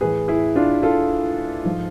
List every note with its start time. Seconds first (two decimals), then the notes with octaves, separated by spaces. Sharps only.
0.01 A2 E3 G#4 B4
0.28 E4 G#4
0.56 D4 F4
0.83 F4 A4
1.64 G#2 F3